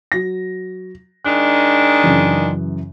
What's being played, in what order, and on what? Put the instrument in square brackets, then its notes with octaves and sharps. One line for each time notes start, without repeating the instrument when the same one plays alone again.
[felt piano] F#3 A#6
[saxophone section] D#3 G#3 D4 [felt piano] F#6
[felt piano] F#2 C#3 E3